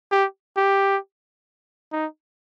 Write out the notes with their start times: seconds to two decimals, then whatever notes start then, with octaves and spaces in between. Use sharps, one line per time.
0.12 G4
0.57 G4
1.92 D#4